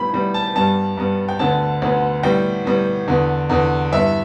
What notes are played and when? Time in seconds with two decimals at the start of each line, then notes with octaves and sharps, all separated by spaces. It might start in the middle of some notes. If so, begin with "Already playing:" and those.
Already playing: A2 G3 B3 B5
0.13 A2 G3 B3
0.34 A5
0.55 G2 G3 B3 A5
0.97 G2 G3 B3
1.29 G5
1.39 D2 D3 B3 A5
1.82 D2 D3 B3
2.23 A2 G3 B3 G5
2.65 A2 G3 B3
3.07 E2 D3 B3
3.49 E2 D3 B3
3.92 G2 E3 B3 E5